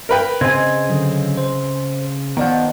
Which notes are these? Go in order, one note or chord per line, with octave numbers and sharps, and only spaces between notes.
A#4 B4 G5
C#3 C4 B4 D#5 G#5 G#6
D3 F#3
C5 C6
D#3 F3 B3 D5 D#5 F#5